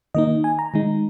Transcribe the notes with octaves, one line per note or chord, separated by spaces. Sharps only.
D#3 A#3 D#4 D#5
G#5
A#5
D#3 G#3 D#4